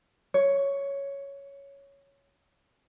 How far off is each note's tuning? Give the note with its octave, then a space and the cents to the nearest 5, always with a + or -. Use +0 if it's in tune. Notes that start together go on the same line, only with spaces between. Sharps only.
C#5 +5